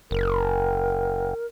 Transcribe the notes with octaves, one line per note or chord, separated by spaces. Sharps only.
F#1 A#4